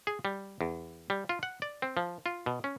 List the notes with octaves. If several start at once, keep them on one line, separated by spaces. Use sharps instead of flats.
G#4
G3
E2
G3
F4
F#5
D5
C4
F3
F4
B2
C#4